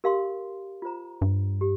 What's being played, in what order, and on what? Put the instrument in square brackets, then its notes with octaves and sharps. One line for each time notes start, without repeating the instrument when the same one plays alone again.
[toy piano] G4 A#4 F5 C6
F4 C5 A#5
[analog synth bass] G2
[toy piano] G4